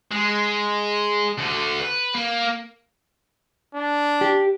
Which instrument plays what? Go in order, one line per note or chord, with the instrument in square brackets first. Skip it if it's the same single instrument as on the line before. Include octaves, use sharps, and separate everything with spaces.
[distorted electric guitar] G#3
D2 D3
B4
A#3
[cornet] D4
[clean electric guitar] G4